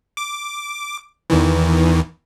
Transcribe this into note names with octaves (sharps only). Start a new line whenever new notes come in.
D6
E2 D#3 E3